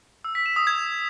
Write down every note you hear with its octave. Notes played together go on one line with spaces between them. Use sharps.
E6
B6
E7
D#6
G#6